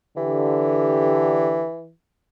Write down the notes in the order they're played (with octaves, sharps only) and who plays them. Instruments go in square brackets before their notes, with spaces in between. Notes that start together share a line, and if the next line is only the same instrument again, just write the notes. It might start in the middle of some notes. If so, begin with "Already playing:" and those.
[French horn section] D3 G4 [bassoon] E3